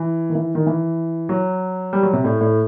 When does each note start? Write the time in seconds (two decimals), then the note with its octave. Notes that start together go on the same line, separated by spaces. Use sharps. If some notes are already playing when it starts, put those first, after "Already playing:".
Already playing: E3
0.30 D#3
0.35 E3
0.55 D#3
0.67 E3
1.29 F#3
1.93 G3
2.03 F#3
2.13 C3
2.24 A2
2.41 A2